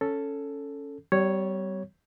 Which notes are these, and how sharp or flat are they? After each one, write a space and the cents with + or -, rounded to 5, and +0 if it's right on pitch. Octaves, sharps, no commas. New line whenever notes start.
C#4 +5 A4 +5
G3 -30 B3 +45 C#5 +0